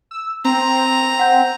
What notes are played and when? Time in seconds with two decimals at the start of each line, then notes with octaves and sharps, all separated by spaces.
0.11 E6
0.45 C4 A#5
1.19 F#5 G6